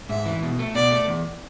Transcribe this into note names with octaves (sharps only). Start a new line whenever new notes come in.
G#2 E5
E3
B2
A3
B2 D5
A3
E2